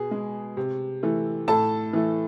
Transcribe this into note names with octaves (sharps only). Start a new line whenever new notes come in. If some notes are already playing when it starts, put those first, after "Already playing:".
Already playing: B2 G#4
G#3
C3
E3 A3
A2 A4 A5
E3 A3